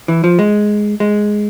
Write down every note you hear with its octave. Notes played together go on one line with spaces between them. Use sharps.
E3
F3
G#3
G#3